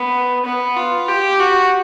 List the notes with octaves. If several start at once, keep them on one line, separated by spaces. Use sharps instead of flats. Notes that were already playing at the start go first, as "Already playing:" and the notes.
Already playing: B3
B3
F4
G4
F#4